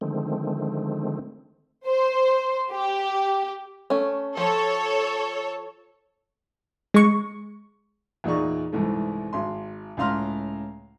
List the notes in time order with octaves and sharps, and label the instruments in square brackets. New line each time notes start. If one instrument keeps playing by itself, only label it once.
[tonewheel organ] D3 D#3 F3 G#3 A3 C4
[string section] C5
G4
[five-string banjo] A3 C#4
[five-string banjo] F3 [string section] A4 C#5
[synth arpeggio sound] G#3 C#6
[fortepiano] E2 A#2 D#4 G#4 D5 C#6
C2 G#2 E3 A3
G#1 C6
C#2 A2 F5 A#5 C6 F6